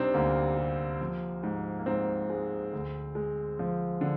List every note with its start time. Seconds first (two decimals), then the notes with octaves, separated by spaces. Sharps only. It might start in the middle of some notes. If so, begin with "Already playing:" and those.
Already playing: C3 G3 C4 D4 D#4
0.14 D2 A#3
0.57 C3
1.01 F3
1.43 G#2
1.79 A#3
1.86 G#2 C4
2.30 G#3
2.73 D2
3.15 G#3
3.59 F3
4.01 D3